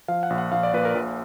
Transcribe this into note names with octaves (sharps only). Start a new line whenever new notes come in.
F3 F5
F#5
A#1
F#5
A#1 F5
D5
A#2 B4
A#4
A#1